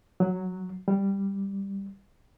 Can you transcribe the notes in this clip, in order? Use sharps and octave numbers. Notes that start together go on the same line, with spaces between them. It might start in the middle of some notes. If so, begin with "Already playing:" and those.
F#3
G3